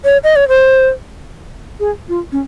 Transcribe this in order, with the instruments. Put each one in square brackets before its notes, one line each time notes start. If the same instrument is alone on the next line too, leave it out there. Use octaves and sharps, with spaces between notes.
[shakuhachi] C#5
D#5
C#5
C5
G#4
F4
C#4